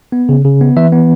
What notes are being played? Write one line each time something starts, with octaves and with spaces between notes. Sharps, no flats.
B3
C#3
C#3
B3
E3 E5
B3